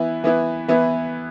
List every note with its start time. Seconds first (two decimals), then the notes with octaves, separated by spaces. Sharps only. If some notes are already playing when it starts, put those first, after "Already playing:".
Already playing: E3 B3 E4
0.24 E3 B3 E4
0.68 E3 B3 E4